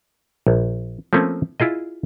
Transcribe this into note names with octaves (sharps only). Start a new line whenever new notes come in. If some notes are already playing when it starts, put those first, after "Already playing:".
A#1
F3 A3 A#3 C4 C#4
E4 F4 G#4 D#5